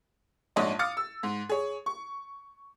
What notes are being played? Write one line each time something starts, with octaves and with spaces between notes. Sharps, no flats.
A#1 G#2 D4 C#5 D#5
F5 D6 D#6 F6 A6 C#7
E6
G#2
G#4 C#5
C#6